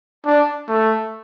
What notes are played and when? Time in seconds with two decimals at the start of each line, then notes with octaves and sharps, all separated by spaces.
0.26 D4
0.68 A3